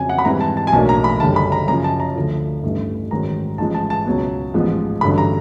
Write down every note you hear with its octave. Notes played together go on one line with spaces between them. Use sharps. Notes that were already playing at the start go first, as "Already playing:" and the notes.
Already playing: F2 C#3 F#3 G#5
F#5
B5
G#2 E3 G3 C4 A#5
A5
A5
G#5
B1 A2 F#3 A#3 D4 A5
A#5
B5
F#1 F#2 D3 G3 A5
B5
A#5
F#2 C#3 F3 A#5
A5
A#5
D2 D3 F3
A1 G2 E3 A3
A1 G#2 D#3 F#3 A#5
A1 G#2 F3 G#3 A5
A5
A5
C#2 B2 F#3 B3
A1 G#2 F3 G#3 B3
A1 G2 D3 F#3 B5
A#5